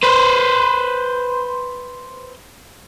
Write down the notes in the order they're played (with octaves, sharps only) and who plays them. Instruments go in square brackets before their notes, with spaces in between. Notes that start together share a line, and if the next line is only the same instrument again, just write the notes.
[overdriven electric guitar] B4 C5